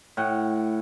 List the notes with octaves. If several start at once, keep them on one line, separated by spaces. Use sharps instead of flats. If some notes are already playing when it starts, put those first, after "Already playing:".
A2 F#5 G5